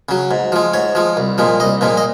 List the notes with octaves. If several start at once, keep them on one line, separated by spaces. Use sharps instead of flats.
C#3 F#3
G#2
F3 G#3
G#2 C#5
F3 G#3
C2
A#2 F3 G#3
C2 D#5
A#2 F3 G#3
D#5